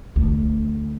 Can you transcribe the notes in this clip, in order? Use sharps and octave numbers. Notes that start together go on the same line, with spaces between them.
D2